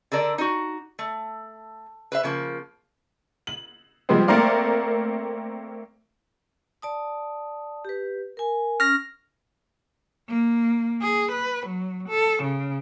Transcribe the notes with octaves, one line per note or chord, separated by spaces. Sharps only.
D3 A4 A#4 D5
D#4 F#4
A3
B4 C5 E5
C#3 F3 A#3
F#7
F3 G3 G#3 B3 C4
A3 A#3 C4 A#4 D5 F5
D5 A5 D#6
G4 B4
A#4 G#5
C#4 F6 A#6
A#3
G#4
B4
F#3
A4
C#3